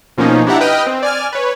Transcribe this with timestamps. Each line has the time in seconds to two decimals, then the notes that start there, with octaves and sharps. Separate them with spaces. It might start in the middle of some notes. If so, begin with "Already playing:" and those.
0.18 B2 F3 A#3 C#4 D#4
0.47 D4 E4 G4 E5 F#5 A#5
0.61 B4 D#5 G5 D#6 F6
0.87 C4
1.03 D5 G#5 F6
1.33 B4 C#5